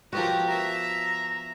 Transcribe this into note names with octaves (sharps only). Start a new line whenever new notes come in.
F3 B3 F#4 G4 A#4
E5 A#5